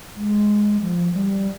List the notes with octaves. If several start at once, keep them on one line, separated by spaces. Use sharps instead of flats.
G#3
F3
G3